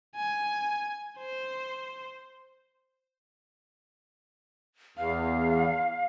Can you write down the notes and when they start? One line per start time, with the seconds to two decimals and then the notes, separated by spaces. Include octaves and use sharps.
0.16 G#5
1.19 C5
4.97 E2 F5